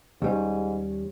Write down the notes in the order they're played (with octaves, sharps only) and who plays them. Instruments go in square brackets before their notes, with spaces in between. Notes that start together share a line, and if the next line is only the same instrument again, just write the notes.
[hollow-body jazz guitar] D#2 G3 C#4 [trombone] G#2